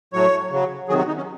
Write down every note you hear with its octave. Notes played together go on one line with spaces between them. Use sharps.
A2 F#3 C#5
C#3 F#3
C3 D#3 F#3 G#4
F#4
D#4
C#4